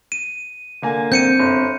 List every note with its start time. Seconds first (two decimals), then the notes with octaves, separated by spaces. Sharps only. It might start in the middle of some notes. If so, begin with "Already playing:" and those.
0.12 D#7
0.82 D3 A#3 G#5
1.12 C4 G6 C#7 D#7
1.39 G1